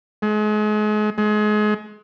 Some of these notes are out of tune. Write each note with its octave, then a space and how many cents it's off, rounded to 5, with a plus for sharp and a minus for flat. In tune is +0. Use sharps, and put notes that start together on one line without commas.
G#3 +35
G#3 +30